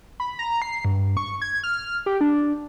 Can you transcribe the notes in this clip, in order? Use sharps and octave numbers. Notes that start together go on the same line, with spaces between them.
B5
A#5
C7
G2
C#6
G#6
F6
G4
D4